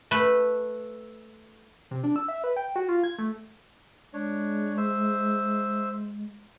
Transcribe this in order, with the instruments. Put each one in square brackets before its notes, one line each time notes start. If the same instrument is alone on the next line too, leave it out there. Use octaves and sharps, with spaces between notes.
[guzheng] A3 B4
[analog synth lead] C3
D4
E6
E5
B4
G5
F#4
F4
G#6
A3
[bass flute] G#3 [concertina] D4 C#5
[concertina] C5 E5